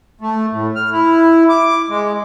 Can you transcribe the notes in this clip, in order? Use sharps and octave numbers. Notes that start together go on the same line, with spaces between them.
A3
A2
F6
E4
D6
G#3